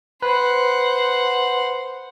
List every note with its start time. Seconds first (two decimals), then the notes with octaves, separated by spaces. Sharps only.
0.22 B4 C5 F#5